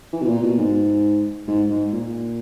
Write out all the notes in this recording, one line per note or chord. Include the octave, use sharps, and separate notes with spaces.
E3
B2
A#2
B2
G#2
G#2
G#2
A#2